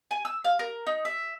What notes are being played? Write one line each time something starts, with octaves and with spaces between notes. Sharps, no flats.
G#5
E6
F5
A#4
D#4
E5